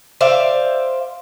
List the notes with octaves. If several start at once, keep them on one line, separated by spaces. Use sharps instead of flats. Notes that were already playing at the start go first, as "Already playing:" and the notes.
C5 D5 E5 F5